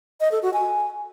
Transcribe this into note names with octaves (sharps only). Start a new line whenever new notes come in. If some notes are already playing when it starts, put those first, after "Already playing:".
D#5
A4
F#4
G#5